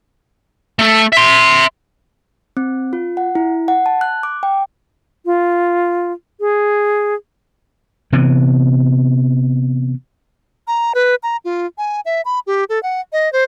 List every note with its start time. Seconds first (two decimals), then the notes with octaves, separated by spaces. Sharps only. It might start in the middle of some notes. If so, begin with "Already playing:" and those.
0.79 A3 A4
1.12 E5 C6
2.57 C4
2.93 F4
3.17 F#5
3.35 E4
3.68 F#5
3.86 A5
4.01 F#6
4.23 D6
4.43 G5
5.26 F4
6.40 G#4
8.13 C3 E3 B3
10.67 A#5
10.95 B4
11.23 A#5
11.45 F4
11.78 G#5
12.05 E5
12.25 B5
12.47 G4
12.69 A4
12.83 F#5
13.13 D#5
13.33 C5